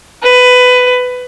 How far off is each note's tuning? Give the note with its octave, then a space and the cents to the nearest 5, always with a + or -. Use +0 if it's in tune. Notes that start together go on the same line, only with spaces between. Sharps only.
B4 +15